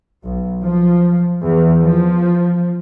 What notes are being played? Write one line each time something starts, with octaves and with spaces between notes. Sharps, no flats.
B1
F3
E2
F3